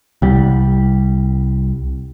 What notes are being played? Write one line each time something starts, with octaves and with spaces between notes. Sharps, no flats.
C2 G3